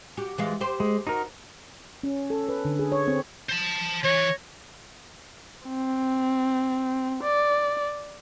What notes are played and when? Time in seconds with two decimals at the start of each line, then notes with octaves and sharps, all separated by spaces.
0.17 F#4 G4
0.38 E3 G#3 F4
0.61 G4 C5
0.80 G#3
1.07 D#4 F#4 A#4
2.03 C#4
2.30 A4
2.49 B4
2.65 D3
2.79 G#4
2.92 C#5
3.08 C4
3.50 C5 A5
4.04 E3 C#5
5.68 C4
7.23 D5